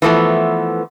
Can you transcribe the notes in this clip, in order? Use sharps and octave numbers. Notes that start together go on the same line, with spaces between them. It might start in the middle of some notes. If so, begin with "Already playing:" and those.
E3 F3 A3 B3